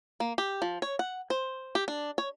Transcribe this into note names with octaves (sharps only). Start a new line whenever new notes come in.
A#3
G4
F3
C#5
F#5
C5
G4
D4
C#5